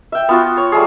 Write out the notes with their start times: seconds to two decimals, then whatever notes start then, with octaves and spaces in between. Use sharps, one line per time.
0.12 E5 G5
0.29 B3 F4 F#4
0.57 C#5
0.72 G3 A3 G#4